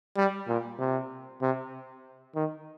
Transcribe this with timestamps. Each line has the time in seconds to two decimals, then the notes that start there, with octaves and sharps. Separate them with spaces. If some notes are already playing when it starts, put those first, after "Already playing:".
0.16 G3
0.48 A#2
0.79 C3
1.41 C3
2.35 D#3